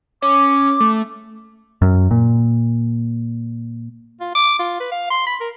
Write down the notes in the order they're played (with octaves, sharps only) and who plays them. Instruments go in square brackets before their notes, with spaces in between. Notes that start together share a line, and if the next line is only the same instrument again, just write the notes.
[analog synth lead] C#4 [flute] D6
[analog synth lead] A3
[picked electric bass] F#2
A#2
[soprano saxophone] F4
D6
F4
B4
F5
C6
B5
A#4